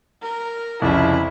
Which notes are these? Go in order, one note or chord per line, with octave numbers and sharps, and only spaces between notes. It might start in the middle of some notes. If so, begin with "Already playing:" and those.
A#4
C2 F2 C#3 E4